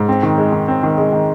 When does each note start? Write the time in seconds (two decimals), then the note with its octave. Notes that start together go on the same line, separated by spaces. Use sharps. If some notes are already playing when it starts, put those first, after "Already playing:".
Already playing: G#2
0.09 C4
0.23 D#3
0.38 G#3
0.52 D#3
0.68 C4
0.83 D#3
0.98 G#3
1.13 D#3